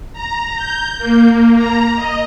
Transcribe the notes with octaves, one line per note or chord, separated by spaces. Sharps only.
A#5
G6
A#3
A#5
D#5